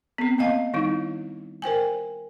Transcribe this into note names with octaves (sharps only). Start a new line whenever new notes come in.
B3 C4
A#3 C4 D#5 F5 A5
D#3 G3 D#4 E4
A#4 C5 G5 G#5